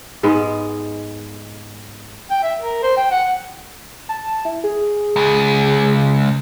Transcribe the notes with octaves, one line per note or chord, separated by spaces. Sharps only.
G#2 G#3 B3
G5
E5
A#4
C5
G5
F#5
A5
E4
G#4
C#2